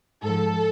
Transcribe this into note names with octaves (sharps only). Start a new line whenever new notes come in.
G#2 F3 A4